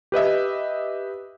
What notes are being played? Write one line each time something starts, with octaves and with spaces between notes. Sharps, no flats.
G4 B4 D#5 E5